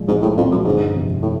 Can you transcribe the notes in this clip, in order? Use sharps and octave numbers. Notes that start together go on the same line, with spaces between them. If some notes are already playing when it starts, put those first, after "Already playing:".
Already playing: A#2 F3 G#3
C2 G#2
A2
F2 A#2 F3 G#3
F#2
G1 G#2
F2 C3
A2